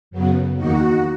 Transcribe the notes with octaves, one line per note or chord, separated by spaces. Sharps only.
F#2 C#3 F#3 B3
E2 D#3 A#3 D#4 F#4